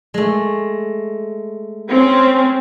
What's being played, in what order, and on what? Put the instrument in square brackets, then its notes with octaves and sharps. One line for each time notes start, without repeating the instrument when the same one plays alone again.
[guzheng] G#3 A3
[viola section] C4 C#4